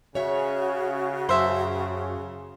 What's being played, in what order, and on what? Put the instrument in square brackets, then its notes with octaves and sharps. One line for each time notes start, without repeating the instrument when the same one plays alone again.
[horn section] C#3 [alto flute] F#4 [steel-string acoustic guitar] C#5 E5
[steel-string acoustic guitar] F#2 A5 [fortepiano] C5 E5